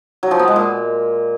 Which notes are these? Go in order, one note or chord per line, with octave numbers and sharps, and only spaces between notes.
F#3
F3
B3
G#3
A#2